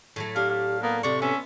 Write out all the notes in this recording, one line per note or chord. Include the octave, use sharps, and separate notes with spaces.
A2 F#3 A3
D4 G4 F5
F5
A#3 B3 A#4
C3 A4 D5 F#5 C#6
B3 C#4 E5